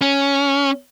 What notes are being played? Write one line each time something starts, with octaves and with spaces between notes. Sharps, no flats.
C#4